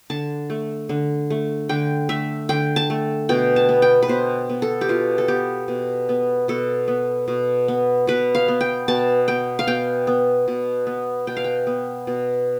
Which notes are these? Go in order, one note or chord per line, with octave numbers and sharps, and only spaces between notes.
D3 A5
A3
D3
A3
D3 G5
A3 E5
D3 G5
A5
A3
B2 G5
A5
B3
G5
B4
B2 C5
B3
A4
G4
B2 F4
A4
B3 G4
B2
B3
B2 A4
B3
B2
B3
B2 B4
F5
B3
G5
B2 A5
B3 G5
F5
B2 G5
B3
B2
B3
B2 G5
F5
G5
B3
B2